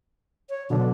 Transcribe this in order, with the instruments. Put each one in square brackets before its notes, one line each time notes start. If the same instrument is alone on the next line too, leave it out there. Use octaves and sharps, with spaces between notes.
[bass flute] C#5
[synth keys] B2 D3 F#3 [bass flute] D4